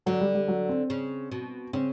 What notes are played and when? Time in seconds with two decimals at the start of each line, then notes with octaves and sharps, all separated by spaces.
0.06 D3 F#3
0.20 G3
0.35 G3
0.48 F#3
0.69 C4
0.90 C#3
1.32 B2
1.73 C#3 C4